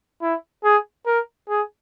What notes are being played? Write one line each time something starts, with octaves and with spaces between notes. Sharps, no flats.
E4
G#4
A#4
G#4